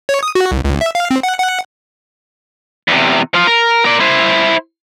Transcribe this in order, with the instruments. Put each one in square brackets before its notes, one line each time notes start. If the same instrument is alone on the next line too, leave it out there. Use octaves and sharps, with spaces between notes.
[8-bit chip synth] C#5
D#6
F#4
C2
C#2
E5
F5
C4
F#5
F#5
[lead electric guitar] E2 C3
F3 F4
A#4
A#4 D5
E4 C5